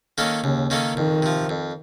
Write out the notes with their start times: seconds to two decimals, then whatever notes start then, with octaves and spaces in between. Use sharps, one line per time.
0.18 D#3 A#3 C#4 A4
0.43 D#2 C#3
0.70 D#3 A#3 C#4 A4
0.96 F2 D#3
1.22 C3 F3
1.49 F2